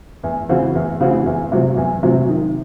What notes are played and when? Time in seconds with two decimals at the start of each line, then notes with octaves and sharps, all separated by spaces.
0.23 E2
0.49 C#3 E3 C4 F#4
0.75 E2
1.00 C#3 E3 C4 F#4
1.26 E2
1.52 C3 F#3 C4
1.77 E2
2.03 C3 F#3 C4
2.29 D#3